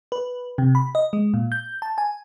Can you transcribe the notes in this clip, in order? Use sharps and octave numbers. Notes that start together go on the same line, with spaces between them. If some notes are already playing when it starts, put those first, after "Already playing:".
B4
C3
B5
D#5
G#3
A#2
G6
A5
G#5